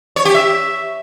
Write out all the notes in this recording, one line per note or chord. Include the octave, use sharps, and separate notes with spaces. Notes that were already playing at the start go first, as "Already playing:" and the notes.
C#5
G4
E5